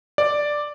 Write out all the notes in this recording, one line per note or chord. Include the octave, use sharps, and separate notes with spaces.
D5